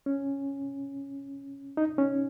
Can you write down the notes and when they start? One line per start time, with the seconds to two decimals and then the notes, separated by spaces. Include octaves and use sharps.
0.06 C#4
1.77 D#4
1.98 C#4